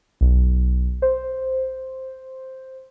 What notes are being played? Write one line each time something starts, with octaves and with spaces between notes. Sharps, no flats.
B1
C5